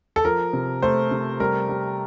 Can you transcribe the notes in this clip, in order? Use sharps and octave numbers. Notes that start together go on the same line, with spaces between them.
A4
F3 A#4
C3
A3 C5
C3
G3 A#4
G3